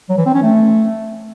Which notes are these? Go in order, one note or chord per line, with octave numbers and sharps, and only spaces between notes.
F#3
E3
C4
C#4
A3